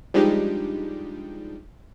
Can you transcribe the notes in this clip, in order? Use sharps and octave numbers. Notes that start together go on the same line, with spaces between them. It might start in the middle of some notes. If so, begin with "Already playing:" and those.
F3 G3 G#3 D4 D#4 G4